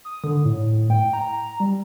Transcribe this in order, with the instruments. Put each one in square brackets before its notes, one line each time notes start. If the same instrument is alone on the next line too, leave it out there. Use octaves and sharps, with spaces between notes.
[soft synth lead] D#6
D3
A2
G5
A#5
G3